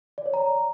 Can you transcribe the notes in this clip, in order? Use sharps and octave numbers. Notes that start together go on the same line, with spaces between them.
D5
C#5
A#5